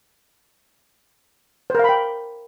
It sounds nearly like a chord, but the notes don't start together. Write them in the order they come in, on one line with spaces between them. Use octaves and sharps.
C5 A#4 F5 B5 G5